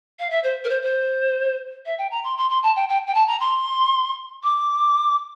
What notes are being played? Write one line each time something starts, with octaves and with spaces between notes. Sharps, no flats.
F5
E5
C5
A#4
C5
C5
E5
G5
A#5
C6
C6
C6
A5
G5
G5
G5
A5
A#5
C6
D6